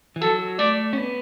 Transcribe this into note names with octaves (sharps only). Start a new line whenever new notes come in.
E3
F#3 A4
A3 D5
C#4
B3